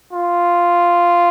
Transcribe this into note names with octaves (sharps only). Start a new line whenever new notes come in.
F4